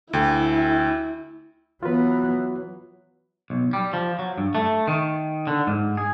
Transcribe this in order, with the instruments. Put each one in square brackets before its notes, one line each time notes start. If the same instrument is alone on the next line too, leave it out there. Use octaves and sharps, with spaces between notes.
[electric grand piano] D2 G5 [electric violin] E4
[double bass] E3 B3 [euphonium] F#3 [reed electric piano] F4 B4
[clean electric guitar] B1
G3
F3
F#3
G2
A3
D#3
D3
G#2
G#4